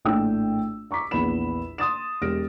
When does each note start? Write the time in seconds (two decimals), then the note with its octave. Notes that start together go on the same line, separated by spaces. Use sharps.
0.05 A#1 A2 A3 D4 G5 E6
0.91 A#5 C#6 D6 B6
1.11 A#1 E2 B3 B5 E7
1.78 C6 D#6 A6 E7
2.22 E1 G4 F6 A#6 D7